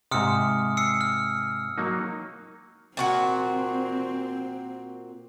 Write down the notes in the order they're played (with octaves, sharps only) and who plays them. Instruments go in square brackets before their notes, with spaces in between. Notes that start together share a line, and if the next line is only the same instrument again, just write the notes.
[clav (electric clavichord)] G#2 C3 [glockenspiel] D#6 F6 C#7
[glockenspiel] E6 C7 C#7
F6
[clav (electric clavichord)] F#3 A#3 D#4
[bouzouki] A#2 F#4 F#5 [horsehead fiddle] C4